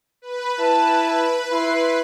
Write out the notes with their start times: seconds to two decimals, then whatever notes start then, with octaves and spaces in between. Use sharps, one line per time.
0.22 B4
0.59 E4 A5
1.52 E4 C6